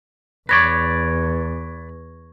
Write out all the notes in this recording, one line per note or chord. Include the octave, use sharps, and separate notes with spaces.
E2 B4 C#5 D5 C#6 G#6 A#6